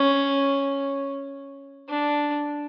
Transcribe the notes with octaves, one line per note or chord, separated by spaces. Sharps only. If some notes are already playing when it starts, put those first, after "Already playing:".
Already playing: C#4
D4